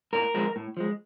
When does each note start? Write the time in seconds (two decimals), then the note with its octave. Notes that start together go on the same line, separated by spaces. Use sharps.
0.13 A2 A#4
0.34 F3 G#3
0.56 A2
0.77 F3 G#3